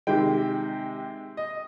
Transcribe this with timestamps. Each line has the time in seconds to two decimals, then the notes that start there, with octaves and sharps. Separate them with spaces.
0.07 C3 D#3 G#3 G5
1.37 D#5